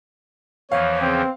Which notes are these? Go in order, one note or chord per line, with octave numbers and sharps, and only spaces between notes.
E2 E3 F3 C#5 F5
C#3 C4 G5